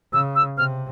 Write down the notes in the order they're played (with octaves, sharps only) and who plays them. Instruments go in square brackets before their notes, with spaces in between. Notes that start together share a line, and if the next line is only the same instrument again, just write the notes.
[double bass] C#3 [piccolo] E6
[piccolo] E6
[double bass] C3 [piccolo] F6